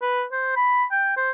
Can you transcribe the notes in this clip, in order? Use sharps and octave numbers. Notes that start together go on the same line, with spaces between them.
B4
C5
B5
G5
C5